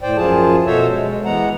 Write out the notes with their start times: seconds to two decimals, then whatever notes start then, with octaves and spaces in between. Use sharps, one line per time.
0.02 A2 C5 D5 G5
0.17 F#2 F3 F4 G#4 A5
0.66 B2 F#4 A4 C5 C#5 E5
0.91 G#3
1.25 E3 G#3 B3 F#5 A#5